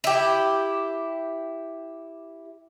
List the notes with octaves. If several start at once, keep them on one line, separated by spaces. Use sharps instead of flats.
E4 G4